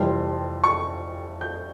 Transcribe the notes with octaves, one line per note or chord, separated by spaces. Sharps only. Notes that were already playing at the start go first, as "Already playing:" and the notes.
Already playing: F1 F2 E3 G3 C6
C#6
G6